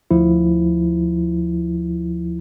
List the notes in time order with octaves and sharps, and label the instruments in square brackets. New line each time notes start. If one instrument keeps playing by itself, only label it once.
[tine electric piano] D2 F3 E4